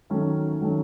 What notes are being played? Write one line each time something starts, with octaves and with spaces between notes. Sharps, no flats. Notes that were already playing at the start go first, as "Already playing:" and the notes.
D#3 F#3 A3 C#4
D#3 F#3 A3 C#4